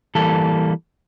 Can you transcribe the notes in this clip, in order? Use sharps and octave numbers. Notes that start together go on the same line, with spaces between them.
E3 G3 A#3 A4